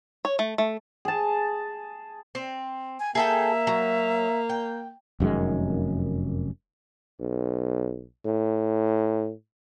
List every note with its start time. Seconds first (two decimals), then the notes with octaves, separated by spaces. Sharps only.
0.25 C#5
0.39 A3
0.58 A3
1.05 G#4 A5
2.35 C4
2.99 G#5
3.15 A#3 G#4 A4 E5 G5
3.67 F#3
4.49 G5
5.20 F1 F#2 D#3 G#3
7.20 B1
8.26 A2